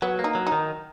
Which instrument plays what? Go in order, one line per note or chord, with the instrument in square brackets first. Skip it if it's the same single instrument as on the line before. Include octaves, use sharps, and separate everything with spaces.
[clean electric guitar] F#3 [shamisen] B3
[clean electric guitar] A#3
[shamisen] D#4
[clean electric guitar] F#3
[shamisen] D#4
[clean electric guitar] D#3